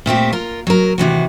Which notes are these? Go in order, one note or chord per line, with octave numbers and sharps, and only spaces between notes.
A#2 A3 C4 G4
F4 A#4
F#3 A#4
D#2 C3 E3 F#4